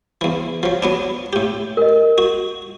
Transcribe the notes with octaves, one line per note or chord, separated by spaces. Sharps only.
E2 E3
F3 F#3
F#3 B3 D4
A2 G4
A#4 D#5
F#4